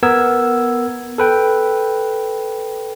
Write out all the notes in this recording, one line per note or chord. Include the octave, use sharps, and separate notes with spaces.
B3 A#4 E6 G#6
A4 B4 G5